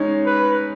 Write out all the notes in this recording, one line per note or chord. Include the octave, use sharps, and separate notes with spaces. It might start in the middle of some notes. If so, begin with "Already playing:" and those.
Already playing: G#3 C#4 D#4
B4